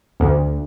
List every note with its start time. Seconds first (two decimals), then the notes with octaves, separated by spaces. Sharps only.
0.20 D2